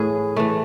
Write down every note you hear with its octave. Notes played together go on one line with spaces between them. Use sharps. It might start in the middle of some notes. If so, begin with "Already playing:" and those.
Already playing: A2 E3 G#4
E3 A3